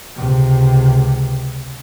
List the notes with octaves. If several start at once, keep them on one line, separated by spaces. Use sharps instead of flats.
C#2 C3